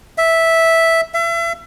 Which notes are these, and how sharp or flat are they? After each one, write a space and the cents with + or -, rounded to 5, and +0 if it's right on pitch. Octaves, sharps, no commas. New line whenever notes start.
E5 -5
E5 +35